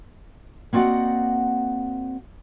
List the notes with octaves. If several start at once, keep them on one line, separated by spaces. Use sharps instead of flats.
A#3 C4 F#4 D5 D#5 F#5